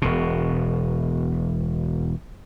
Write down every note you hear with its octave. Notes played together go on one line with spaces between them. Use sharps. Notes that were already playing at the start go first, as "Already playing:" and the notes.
E1 B2